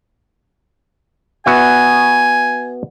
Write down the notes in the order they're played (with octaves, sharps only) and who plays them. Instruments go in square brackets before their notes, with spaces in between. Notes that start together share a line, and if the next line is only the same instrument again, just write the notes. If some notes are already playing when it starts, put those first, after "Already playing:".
[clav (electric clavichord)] B3 F#4 E5 [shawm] G#5